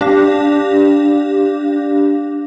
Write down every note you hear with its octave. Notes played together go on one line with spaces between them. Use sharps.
D4 G4 F5 A#6